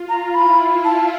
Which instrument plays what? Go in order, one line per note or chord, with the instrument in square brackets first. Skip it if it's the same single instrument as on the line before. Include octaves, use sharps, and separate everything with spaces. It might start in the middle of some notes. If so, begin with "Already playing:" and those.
Already playing: [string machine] F4
[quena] A#5
[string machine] E4 [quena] B5
[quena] A5